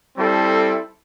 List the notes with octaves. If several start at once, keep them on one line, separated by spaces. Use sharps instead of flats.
G3 C4 E4 A4